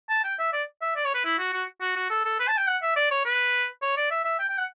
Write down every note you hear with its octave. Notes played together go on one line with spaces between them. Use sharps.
A5
G5
E5
D5
E5
D5
C#5
B4
E4
F#4
F#4
F#4
F#4
A4
A4
B4
A5
G5
F#5
E5
D5
C#5
B4
C#5
D5
E5
E5
G5
G5
F#5